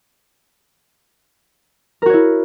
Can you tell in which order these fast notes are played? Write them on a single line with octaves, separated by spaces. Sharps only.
A#4 F#4 C#5 E4